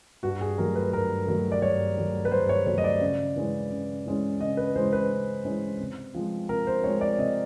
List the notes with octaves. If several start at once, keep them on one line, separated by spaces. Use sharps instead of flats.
G2 F#4
G#4
D#3 F#3 A3 A#4
B4
G2 A#4
D#3 F#3 A3
D5
G2 C#5
D#3 F#3 A3
B4
G2 C5
C#5
D#3 F#3 A3 C#5
D#5
D5
C#3
E3 G#3 C#4
C#3
E3 G#3 C#4
C#3 D#5
B4
E3 G#3 C#4 C5
B4
C#3
E3 G#3 C#4
C3
F3 G#3 C4
C3 A#4
C5
F3 G#3 C4 C#5
D5
C3 D#5